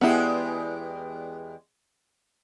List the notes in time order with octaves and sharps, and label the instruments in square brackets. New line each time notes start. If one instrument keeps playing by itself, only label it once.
[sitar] E2 G#3 G4 [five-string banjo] B3 E4